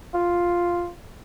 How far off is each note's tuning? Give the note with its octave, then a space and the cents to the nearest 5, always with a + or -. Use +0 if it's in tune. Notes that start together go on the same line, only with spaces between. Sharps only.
F4 +0